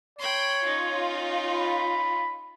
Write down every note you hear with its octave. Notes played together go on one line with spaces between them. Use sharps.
C#5 G5 B5 C6
C#4 D#4 F4
B5